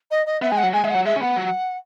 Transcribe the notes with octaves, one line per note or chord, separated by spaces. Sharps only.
D#5
D#5
B3 E5
G#3 G#5
F#5
F#3
G#3 G#5
G#3 E5
F#5
F#3
G#3 E5
C#4
B3 F#5
F#3